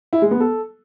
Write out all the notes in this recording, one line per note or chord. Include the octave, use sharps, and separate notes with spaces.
E4
G#3
B3
A4